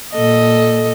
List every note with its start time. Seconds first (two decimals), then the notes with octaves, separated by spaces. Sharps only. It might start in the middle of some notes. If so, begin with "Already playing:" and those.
0.13 A#2 A4 D#5